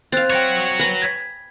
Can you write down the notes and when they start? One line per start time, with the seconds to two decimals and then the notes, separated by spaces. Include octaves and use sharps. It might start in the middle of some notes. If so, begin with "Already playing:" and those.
0.12 C4 F5 F#6 A6
0.30 F#4 C#5 G5 F#6
0.79 B4 G#5 A#5
1.02 G#6 B6